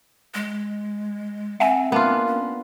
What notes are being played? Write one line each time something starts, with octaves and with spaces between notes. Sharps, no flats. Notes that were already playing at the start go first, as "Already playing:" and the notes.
G#3
C4 E5 F#5 G#5
A#3 B3 D4 F4
C#4